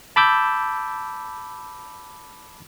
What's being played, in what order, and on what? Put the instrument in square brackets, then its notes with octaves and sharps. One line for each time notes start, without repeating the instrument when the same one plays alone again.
[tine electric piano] A5 B5 D6 E6 G6